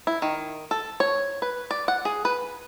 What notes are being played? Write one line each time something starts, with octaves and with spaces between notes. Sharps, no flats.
E4
D#3
A4
C#5
B4
D5
F#5
G#4
B4